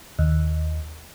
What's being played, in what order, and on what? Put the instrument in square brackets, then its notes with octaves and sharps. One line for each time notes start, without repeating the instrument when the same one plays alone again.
[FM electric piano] D#2